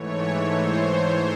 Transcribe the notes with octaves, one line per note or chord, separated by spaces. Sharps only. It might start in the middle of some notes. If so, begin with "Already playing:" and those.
Already playing: G#2 E3 A3 C#5
C5